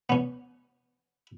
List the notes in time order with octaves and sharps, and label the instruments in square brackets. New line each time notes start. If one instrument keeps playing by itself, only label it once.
[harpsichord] B3 C#4